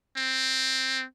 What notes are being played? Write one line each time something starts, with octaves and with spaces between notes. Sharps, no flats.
C4